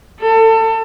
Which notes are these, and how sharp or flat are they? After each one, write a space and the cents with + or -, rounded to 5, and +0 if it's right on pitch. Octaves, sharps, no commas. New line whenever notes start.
A4 +30